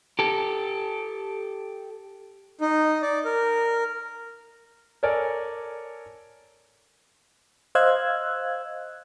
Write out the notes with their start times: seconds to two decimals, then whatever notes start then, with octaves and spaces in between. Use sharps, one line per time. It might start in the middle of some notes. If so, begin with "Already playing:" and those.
0.19 G4 A4
2.61 D#4
3.02 D5
3.25 A#4
5.03 A4 A#4 C#5 D5 G#5
7.75 C5 D#5 F5 E6 F#6 G#6